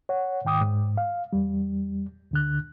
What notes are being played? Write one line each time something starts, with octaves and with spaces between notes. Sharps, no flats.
C#5 F#5
G#2 D#3 G5 D6 D#6
G#2
F5
E2 G3
D2 D3 F#6